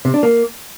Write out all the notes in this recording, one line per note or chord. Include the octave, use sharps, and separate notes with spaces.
C3
D4
A#3